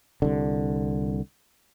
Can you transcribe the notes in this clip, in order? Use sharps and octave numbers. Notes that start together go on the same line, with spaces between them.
C2 D3